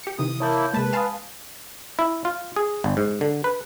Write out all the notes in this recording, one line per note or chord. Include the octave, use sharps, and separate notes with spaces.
G4 C#7
C3 D#3 E3 D#6
A#3 E4 C#5 A5 G6
C3 G#3 A#3 B4 A5
F5 G#5 A5 B5 C6 D#6
E4
F4
G#4
G1
G#2
D3
B4